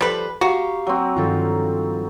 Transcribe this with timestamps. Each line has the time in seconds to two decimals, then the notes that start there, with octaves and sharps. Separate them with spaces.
0.01 F3 G3 A4 B4 C5
0.41 F#4 G4 F5 A#5 C#6
0.87 F#3 C4
1.16 G2 D#3 F3 F4 A4